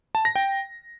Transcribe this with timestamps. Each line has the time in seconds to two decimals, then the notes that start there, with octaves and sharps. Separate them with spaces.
0.15 A5
0.25 A#6
0.36 G5